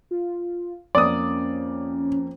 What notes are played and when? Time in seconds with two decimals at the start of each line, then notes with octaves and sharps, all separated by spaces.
0.11 F4
0.95 F2 A#3 C#4 D5 D#6